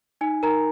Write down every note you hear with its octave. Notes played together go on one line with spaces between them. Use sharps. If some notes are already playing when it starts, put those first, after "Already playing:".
D#4 G#5
D#4 A#4 A#5